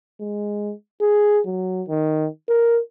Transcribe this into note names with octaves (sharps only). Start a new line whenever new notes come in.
G#3
G#4
F#3
D#3
A#4